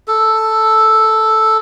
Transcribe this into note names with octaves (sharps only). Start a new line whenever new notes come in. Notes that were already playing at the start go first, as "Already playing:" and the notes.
A4